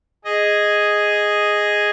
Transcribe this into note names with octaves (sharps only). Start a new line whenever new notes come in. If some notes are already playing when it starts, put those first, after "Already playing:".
G#4 D#5